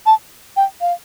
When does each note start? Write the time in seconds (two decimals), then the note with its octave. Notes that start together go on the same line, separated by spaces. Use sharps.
0.06 A5
0.57 G5
0.81 F5